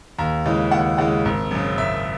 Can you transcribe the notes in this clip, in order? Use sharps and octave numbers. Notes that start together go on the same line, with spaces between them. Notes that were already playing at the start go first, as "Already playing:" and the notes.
D#2 A#5
C#3 E3 G#3
D#2 F#5
C#3 E3 G#3 F#5
G#1
F#2 C#3
G#1 E5